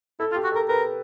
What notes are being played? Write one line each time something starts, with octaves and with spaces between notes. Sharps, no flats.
E4 A4
F4
G4
F#4
A4 A#4
A#4 B4